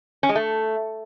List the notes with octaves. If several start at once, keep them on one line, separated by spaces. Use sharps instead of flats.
C#4
G#3
A3